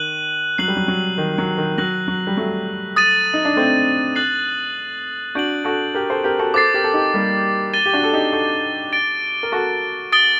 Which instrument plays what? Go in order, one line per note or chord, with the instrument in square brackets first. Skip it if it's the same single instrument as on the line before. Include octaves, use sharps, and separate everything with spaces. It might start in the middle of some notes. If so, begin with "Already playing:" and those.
Already playing: [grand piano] D#3 [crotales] F#6 D#7 F#7
[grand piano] F#3 [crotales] F#6 C7 F#7
[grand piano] G3
F#3
F#3
D#3
F#3
D#3
[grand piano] F#3 [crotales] F#6 A#6 F#7
[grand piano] F#3
G3
F#3 A3
[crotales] D#6 A6 D#7
[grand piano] D#4
D4
A3 C4
[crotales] F#6 A6 C7 F#7
[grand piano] D4 F#4 [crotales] G6 D7 F#7
[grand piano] F#4 A4
G4 A#4
A4 C5
G4 A#4
F#4 A4
[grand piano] A4 C5 [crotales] D6 A6 C7
[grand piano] G4 A#4
A4
D#4 G4
G3 A#3
[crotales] A6 D#7 G7
[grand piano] G4
D4 F#4
A4
D#4 G4
F#4 A4
[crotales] A6 D7 G7
[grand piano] A#4
F#4 A4
[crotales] D#6 A6 D7 G7